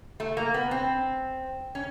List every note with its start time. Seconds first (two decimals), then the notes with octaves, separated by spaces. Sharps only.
0.20 A3
0.37 A#3
0.54 B3
0.71 C4
1.75 C#4